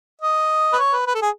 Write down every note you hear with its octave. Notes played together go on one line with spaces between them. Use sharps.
D#5
B4
C#5
B4
B4
A4
G#4